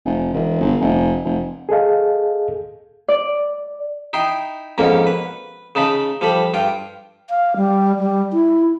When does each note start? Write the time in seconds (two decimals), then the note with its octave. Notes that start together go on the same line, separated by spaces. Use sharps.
0.05 F1
0.34 E1
0.60 G1
0.81 F1
1.25 F1
1.69 G#4 A4 D#5 F5
3.08 D5
4.13 D#4 E4 G5 C6
4.78 F2 G#2 B2 A#3 C#4
5.07 B4
5.75 C#3 D#4 A5 B5
6.21 F3 G3 A4 B5
6.54 G2 F4 G5
7.30 F5
7.56 G3
7.99 G3
8.33 E4